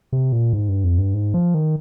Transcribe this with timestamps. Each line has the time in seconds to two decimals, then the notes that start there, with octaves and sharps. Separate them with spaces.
0.12 C3
0.32 A#2
0.53 G#2
0.69 G2
0.84 F2
0.98 G2
1.14 G#2
1.34 F3
1.54 D#3